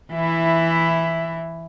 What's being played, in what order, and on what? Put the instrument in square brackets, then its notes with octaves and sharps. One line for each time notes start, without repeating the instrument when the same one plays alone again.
[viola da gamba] E3 E4